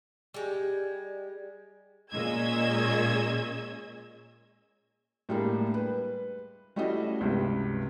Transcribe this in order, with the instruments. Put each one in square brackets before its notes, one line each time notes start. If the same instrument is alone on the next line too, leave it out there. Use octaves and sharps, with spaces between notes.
[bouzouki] G3 G#3
[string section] A#2 G#3 C#4 D#5 E6 G#6
[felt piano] A2 G3 G#3 A#3 D4
B4
G3 A3 C#4 E4 F#4 D#5
C#2 G2 C3